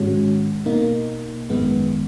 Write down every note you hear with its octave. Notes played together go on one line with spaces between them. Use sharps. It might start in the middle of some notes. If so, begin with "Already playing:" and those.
Already playing: G#2 D#3 G#3 C#4 F#4
B2 A#3 D#4
G#1 F#2 D#3 G#3 B3